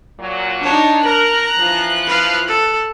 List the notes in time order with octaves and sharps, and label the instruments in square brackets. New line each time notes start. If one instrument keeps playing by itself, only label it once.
[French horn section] A#2 F#3
[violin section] D4 D#4 [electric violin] C#5
[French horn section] A#4 [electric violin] A#5 [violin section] F#6
[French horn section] E3 F3
[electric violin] B4 F5
A4